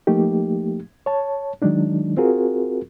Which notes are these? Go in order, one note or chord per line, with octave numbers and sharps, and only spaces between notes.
F3 A3 A#3 D#4 G4
C#5 A5
D#3 F#3 G#3 D4 D#4
C4 F4 F#4 G#4 A#4